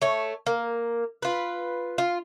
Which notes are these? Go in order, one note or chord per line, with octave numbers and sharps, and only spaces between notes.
A3 C#5
A#3
F4 B4
F4